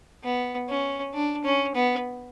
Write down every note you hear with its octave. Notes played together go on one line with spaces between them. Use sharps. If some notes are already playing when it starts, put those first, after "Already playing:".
B3
C#4
D4
C#4
B3